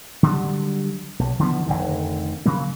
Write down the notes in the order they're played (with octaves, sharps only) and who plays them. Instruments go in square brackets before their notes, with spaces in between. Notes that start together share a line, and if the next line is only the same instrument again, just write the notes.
[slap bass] D3 F#3 G3
B1
D3 E3 F3 B3
F1 C#2 D3 D#3
C#3 F#3 A#3